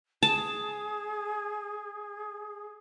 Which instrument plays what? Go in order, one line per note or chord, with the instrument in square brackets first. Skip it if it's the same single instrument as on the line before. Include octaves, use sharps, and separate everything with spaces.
[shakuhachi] G#4 [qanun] A5